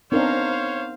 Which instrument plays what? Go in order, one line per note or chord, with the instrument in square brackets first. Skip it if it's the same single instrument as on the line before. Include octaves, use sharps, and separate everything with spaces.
[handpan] B3 D#4 A#4 [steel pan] C4 D4 [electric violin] C5 F5 [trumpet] C#5